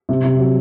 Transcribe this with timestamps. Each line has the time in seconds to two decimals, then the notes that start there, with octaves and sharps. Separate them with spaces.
0.09 C3
0.24 C3
0.39 F#3